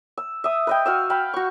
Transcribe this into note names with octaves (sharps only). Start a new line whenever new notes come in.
E6
E5 D#6
B4 D#5 G5
F#4 F5 E6
F5 G5 B5
F#4 C#6